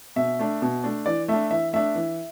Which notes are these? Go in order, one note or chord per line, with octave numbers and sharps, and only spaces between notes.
B2 E5
A3 D4
B2
A3 D4
E3 D5
A3 D4 E5
E3 E5
A3 D4 E5
E3